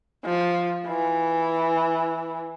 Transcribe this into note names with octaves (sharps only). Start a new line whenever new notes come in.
F3
E3